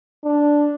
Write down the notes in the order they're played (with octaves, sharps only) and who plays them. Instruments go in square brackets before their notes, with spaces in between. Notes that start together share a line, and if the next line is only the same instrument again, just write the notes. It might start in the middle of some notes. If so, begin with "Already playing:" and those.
[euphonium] D4